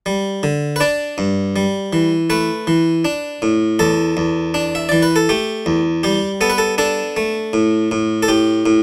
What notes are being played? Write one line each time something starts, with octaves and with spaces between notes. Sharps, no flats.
G3
D3
B4
D4 D5
G2
G3
E3
A3 B4
E3
D4
A2
E2 A4
E2
D4
E5
E3 D5
B4
A4
A3 G4
E2
G3 G4
B3 A4
B4
A4
D4 A4
A3
A2
A2
A4
A2 G4
A2